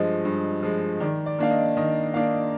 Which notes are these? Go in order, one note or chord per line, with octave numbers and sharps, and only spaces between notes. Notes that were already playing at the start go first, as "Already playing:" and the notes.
Already playing: G2 F3 G#3 D#5
G2
F3 G#3
D#3 D5
D5
A#3 D4 F5
D#5
D#3 D#5
A#3 D4 F5